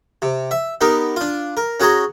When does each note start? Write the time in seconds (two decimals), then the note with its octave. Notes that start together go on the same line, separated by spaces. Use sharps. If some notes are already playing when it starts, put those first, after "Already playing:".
0.22 C3
0.51 E5
0.81 B3 D#4 G4 A#4
1.16 D4 F4
1.57 A#4
1.80 C#4 F#4 G#4 A#5 C6